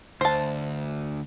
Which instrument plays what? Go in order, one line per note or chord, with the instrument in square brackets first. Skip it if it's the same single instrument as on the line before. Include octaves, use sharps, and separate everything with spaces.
[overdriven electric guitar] D2 [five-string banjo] C5 A5